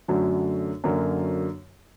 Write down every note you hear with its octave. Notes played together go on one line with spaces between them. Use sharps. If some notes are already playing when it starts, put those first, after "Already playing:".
F#2 D3 F#3 A3
F#2 D3 F#3 A#3